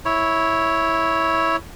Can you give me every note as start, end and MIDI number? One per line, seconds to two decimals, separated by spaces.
0.05 1.56 64
0.05 1.56 73